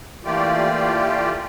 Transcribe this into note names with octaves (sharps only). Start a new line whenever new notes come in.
E3 A3 A#3 F4 G4 D5